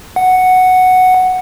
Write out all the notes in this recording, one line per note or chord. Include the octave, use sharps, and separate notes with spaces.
F#5